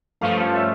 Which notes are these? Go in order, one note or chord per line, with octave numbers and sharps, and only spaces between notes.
G2 F3 A3 C#4 F5
E5